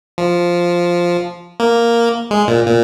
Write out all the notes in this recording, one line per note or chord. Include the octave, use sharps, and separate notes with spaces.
F3
A#3
G#3
A#2
A#2